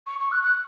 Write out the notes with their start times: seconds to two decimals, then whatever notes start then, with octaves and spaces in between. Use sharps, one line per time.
0.06 C#6
0.19 C#6
0.31 F#6
0.42 F#6